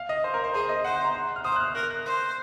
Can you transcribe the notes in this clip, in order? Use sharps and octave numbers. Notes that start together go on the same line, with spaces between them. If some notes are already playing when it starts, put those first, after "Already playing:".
Already playing: F5
D#5
C5
A#4
C5
G#4 C5
D#5
C5 F#5
F#5
A#5
C6
F6
C5 D#6
F#6
F6
A#4 F#6
F#6
C5